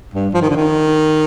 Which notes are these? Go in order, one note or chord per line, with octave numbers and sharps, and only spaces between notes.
G2
F3
D#3
D3
D#3